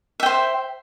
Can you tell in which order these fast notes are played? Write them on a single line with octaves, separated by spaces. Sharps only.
E5 G5 C5